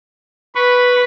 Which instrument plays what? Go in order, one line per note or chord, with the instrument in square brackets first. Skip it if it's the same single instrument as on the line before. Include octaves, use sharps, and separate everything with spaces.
[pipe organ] B4 [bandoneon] B5 C#6